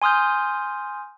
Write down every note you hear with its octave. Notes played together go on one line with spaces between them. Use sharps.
G#5 C6 D#6 F6 G6